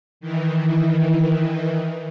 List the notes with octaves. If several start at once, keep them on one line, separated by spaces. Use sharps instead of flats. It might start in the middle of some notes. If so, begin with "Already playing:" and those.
D#3 E3